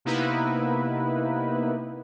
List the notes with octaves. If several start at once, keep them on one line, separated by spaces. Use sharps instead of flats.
C3 A#3 B3 D#4 E4 B4